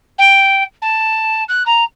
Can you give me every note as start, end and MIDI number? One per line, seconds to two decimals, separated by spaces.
0.18 0.62 79
0.81 1.43 81
1.48 1.62 90
1.65 1.83 82